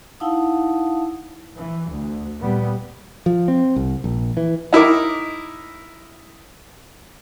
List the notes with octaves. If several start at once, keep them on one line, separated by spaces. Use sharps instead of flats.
D#4 E4 F5 F#5 A5 D#6
E3
D2
A#2 G3 B3
F3
C4
C2
A#1
E3
D#4 E4 A#4 D6